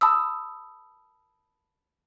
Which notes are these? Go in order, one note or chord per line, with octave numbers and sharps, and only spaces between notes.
A5 B5 D#6 E6